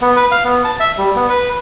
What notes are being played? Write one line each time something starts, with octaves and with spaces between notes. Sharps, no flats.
B3
B4
F5
B3
A5
E5
G3
B3
B4